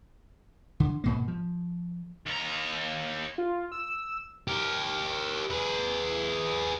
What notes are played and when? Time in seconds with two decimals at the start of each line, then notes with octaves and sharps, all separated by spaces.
0.80 D3
1.04 G#2 B2 A#3
1.28 F3
2.26 D#2 A#5
3.38 F4
3.72 E6
4.48 G4 A#4
5.51 G#4 B4